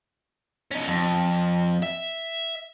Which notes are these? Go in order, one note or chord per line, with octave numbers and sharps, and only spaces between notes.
C#4 D#4
F2
E5